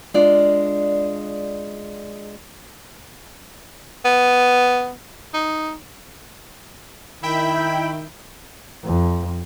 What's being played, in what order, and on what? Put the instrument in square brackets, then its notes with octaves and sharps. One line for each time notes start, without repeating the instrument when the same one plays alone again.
[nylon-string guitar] G#3 D4 F4 D5
[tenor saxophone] B3
D#4
[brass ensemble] D#3 [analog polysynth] E4 E5 G5 [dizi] B5
[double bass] F2